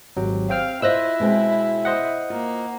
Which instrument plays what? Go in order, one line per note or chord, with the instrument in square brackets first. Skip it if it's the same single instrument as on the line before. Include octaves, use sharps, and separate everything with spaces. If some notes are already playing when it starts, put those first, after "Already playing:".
[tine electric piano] G#1 F#3 [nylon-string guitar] G4
[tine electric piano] C4 G5 F6 [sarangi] F5
[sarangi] E4 [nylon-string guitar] F4 C5 D#5 [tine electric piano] E6 F#6 A#6
[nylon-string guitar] B2 G#3 C4
[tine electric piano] C5 D#5 F#5
[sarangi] A#3 [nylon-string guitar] F4